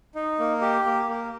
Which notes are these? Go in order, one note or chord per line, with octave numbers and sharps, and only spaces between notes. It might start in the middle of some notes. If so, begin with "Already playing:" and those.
D#4
A#3
G4
A#3
A#3